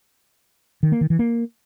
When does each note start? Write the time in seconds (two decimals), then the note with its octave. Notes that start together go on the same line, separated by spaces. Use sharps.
0.83 D#3
0.92 A#3
1.01 D#3
1.10 E3
1.19 A#3